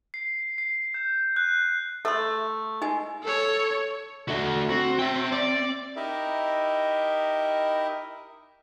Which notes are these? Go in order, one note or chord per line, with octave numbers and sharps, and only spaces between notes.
C7
C7
G6
F#6
A3 A4 C6
G#3 D#4 G#5
A4 C#5
D3 A3 F#4 E5
C4 F#4
E5 G5
D5
D#4 E4 G4 A#4 D#5 E5